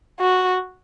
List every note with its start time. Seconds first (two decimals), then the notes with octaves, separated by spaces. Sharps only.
0.20 F#4